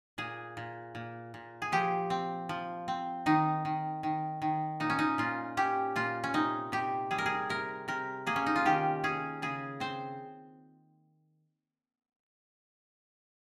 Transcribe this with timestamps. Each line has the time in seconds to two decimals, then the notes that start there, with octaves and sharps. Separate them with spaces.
0.18 A#2 G#4
0.57 A#2
0.95 A#2
1.34 A#2
1.62 G#4
1.72 F3 G4
2.10 C4
2.49 F3
2.88 C4
3.26 D#3 D#4
3.65 D#3
4.03 D#3
4.42 D#3
4.80 A#2 D#4
4.90 C#4
4.99 D#4
5.18 A#2 F4
5.57 C#4 G4
5.96 A#2 F4
6.24 C#4
6.34 C3 D#4
6.72 C3 G4
7.11 G3 G#4
7.18 A#4
7.26 G#4
7.49 C3 A#4
7.88 C3 A#4
8.26 A#3 G#4
8.36 C#4
8.46 D#4
8.56 F4
8.65 D#3 G4
9.04 C#4 G#4
9.42 C#3 G#4
9.80 C4 C5